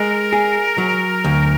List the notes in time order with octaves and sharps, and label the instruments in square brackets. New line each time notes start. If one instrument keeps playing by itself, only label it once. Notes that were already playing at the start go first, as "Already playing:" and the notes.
Already playing: [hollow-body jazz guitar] G#3 [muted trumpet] A#4
[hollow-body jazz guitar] G#4
F#3
D2